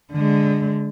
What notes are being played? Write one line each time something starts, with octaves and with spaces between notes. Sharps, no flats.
D3 G#3